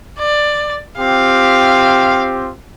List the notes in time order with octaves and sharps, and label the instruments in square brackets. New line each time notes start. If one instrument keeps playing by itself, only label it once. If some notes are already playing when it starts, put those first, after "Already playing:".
[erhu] D5
[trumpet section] C4 F4 G4 [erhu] F5